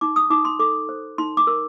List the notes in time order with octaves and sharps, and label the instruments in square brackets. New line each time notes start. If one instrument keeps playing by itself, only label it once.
[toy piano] D#4 D6
D#6
D#4 D6
C6
A4 D6
C5
D#4 C6
D6
A#4